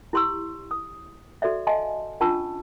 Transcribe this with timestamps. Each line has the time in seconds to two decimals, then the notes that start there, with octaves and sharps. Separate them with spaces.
0.13 E4 G4 C6 C#6 E6
0.71 D#6
1.42 F#4 A4 D5 E5
1.67 D#5 F5 G#5 A5 C6
2.20 C#4 D4 F4 A5 C#6 E6